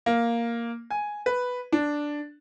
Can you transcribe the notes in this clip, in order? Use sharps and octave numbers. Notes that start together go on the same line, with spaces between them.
A#3
G#5
B4
D4